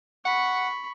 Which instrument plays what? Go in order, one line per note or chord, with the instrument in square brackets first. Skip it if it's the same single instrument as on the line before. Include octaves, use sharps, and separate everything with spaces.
[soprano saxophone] F#5 [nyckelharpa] B5 C#6